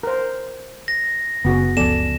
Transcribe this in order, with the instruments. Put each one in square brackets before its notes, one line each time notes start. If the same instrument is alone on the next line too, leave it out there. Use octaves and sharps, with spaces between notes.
[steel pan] A#4 C5
[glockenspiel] A#6
[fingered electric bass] F#1 [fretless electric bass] C#3 [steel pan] B3 F#4 G#4
[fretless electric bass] C#2 F3 B3 [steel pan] A4 D5 G#5 [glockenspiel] E7